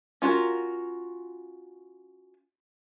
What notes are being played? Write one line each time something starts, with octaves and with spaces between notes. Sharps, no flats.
C#4 F4 F#4 A#4